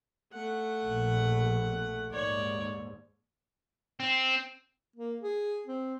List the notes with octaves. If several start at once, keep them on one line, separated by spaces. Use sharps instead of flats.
A3 F#5
A#1 B2
D#2 G#2 C#5 D5
C4
A#3
G#4
C4